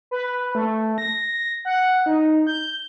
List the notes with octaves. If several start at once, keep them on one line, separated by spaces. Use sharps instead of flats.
B4
A3
A#6
F#5
D#4
G6